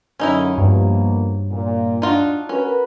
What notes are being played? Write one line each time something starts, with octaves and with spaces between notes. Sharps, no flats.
F#2 D3 C#4 D#4 E4
G2 B2 F3 A#3
A#2
D4 D#4 F4 F#4
C#4 F#4 A#4 B4